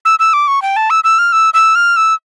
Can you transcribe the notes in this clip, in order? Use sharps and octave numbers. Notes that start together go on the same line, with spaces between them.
E6
E6
D6
C#6
G5
A5
E6
E6
F6
E6
E6
F6
E6